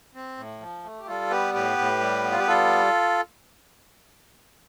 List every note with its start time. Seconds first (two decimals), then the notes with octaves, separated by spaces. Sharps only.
0.15 C4
0.37 A2
0.60 F3
0.84 A3
1.00 G4
1.07 G3 F4 A4
1.31 B3 G4 B4
1.54 A2 G4 B4
1.78 A2
2.00 G3
2.24 B3
2.32 F4
2.40 G4
2.47 G3 F4 A4